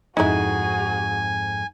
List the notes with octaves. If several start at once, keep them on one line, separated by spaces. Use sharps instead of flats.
F2 G#2 C4 D#4 E4 F#4 G#4 G#5